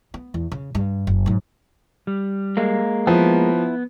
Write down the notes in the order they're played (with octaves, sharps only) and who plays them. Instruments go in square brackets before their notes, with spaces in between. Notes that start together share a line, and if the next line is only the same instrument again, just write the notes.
[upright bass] B3
E2
C#3
G2
F#1
G#2 F#3
[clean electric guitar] G3
[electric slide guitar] G#3 A#3
[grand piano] F3 [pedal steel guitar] B3 [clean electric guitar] E4